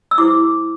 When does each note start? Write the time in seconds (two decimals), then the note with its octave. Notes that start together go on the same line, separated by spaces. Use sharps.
0.11 E6
0.18 E4 G4 C5 D6